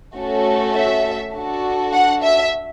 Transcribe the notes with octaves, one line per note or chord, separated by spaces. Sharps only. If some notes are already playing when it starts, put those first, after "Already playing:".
A3 C#4 F#4 A4
E5
D4 F#4 A4
F#5
E5